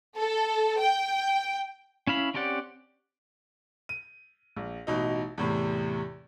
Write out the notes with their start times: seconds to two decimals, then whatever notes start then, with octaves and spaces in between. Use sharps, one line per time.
0.17 A4
0.79 G5
2.07 C#4 E4 F5 B5
2.34 C4 C#4 G4 D5 F#5
3.89 D#7
4.56 A#1
4.87 A1 B2 D#4
5.38 E2 A2 C3